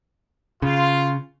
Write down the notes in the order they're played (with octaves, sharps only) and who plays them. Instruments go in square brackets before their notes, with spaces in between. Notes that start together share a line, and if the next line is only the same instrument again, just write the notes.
[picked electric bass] C#3 [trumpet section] F4